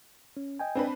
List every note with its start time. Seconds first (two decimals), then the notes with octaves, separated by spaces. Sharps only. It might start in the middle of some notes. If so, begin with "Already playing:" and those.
0.37 C#4
0.59 D#5 G5 G#5
0.75 C4 D4 B4